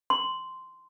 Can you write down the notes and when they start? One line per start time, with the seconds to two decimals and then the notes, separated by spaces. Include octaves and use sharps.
0.10 C6